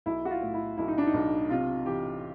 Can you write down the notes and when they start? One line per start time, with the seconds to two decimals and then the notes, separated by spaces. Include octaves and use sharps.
0.06 B1 E4
0.25 F#4
0.30 F4
0.42 A2
0.54 E4
0.77 B1 E4
0.88 D#4
0.98 D4
1.07 D#4
1.14 B1
1.50 C3 F4
1.86 E3 G4